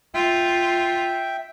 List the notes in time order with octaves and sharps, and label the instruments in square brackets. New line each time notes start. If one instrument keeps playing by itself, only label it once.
[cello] F4 [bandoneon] E5 G5